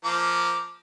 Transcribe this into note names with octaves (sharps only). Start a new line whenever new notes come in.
F3 A#3 D6